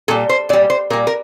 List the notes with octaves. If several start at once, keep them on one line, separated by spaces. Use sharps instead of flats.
A#2 G3 A4
C5
A#2 G3 D5
C5
A#2 G3 A#4
A#4